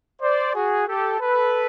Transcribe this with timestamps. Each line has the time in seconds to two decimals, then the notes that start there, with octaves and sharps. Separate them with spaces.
0.22 C5 D5
0.54 F#4 G#4
0.88 G4 A4
1.20 A4 B4